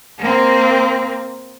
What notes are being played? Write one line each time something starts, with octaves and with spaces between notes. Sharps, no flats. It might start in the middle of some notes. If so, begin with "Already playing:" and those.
A#3 C4